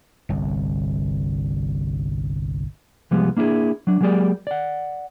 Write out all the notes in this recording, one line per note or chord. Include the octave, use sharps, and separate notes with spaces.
G1 C2
C2 F3 G3 G#3 B3
A#3 D4 E4 F4 G#4
F#3 D4
F#3 G#3 A#3 G4 G#4 D5
D5 F#5